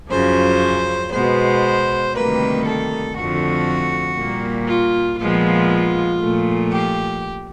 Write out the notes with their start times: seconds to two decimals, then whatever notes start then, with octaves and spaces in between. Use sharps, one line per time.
0.11 F#2 C#3 F3 C5
1.12 B2 G#3 B3 C5
2.14 D2 C3 D#3 G3 A#3 B4
2.65 A4
3.16 F2 D3 F3 A3 F#4
4.18 A#2 G3 A#3
4.69 F4
5.20 A#2 F3 G#3 B3 F4
6.22 A#2 F3 A3
6.72 G4